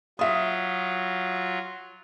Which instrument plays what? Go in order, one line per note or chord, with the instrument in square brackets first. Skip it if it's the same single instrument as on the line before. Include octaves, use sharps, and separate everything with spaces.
[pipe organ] F#3 F4 [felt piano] E5 D#6